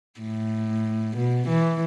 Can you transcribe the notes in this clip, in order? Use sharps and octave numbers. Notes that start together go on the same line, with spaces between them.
A2
B2
E3